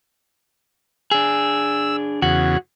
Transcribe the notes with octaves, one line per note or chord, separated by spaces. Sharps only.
D4 G#4 E6
E2 C#3 F#4